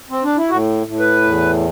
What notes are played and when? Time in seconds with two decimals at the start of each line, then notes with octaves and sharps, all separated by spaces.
0.10 C4
0.24 D4
0.37 E4
0.50 A2 F#4
0.87 A2
1.00 B4
1.24 E2